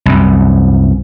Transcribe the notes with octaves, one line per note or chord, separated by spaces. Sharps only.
C2 F#2